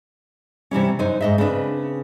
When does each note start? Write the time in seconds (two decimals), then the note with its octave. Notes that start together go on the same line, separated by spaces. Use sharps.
0.71 C3 E3 G3 C#4
0.99 F#2 D#4 C5 G#5
1.21 G#2 D#5 E5
1.38 C#3 C4 D4 B4